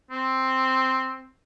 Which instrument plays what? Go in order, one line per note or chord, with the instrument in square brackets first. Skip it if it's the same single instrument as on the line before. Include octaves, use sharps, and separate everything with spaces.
[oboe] C4